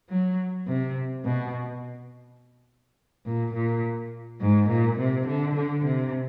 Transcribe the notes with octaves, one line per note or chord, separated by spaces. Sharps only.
F#3
C3
B2
A#2
A#2
G#2
A#2
C3
D3
D3
C3